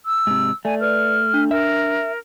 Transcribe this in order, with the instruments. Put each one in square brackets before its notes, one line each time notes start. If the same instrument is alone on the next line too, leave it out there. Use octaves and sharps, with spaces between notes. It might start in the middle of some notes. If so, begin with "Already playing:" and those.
[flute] E6
[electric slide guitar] G#2 C3
[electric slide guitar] A3 [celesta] D5 [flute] G#5
[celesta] B4 D5 [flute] F6
[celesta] D4
[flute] A#4 [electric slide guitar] E5